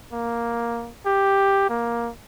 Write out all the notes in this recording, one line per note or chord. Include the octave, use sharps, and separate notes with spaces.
A#3
G4
A#3